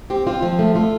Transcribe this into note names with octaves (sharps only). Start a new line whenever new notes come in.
C4 G4
C4 F4
F3 F4
A3
A3 F4